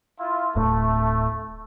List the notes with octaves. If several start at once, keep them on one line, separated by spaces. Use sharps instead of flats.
E4 F4
D1 A2 A3